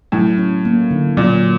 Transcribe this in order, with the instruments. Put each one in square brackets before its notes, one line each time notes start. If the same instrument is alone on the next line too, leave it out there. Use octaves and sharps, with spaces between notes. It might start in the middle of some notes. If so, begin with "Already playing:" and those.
[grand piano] A2 [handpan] F#3
[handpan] C#4
A#3
D3
[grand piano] A#2 [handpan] F#3